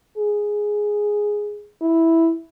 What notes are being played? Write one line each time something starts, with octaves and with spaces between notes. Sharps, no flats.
G#4
E4